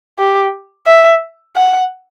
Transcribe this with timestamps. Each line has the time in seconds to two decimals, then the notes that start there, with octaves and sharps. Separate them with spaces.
0.19 G4
0.87 E5
1.56 F#5